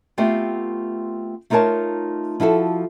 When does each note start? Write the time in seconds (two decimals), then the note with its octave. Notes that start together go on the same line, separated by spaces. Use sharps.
0.18 A3 B3 C4 F4 G4
1.50 A3 D#4 F4 A#4 C#5 A5
2.40 F3 E4 F#4 A4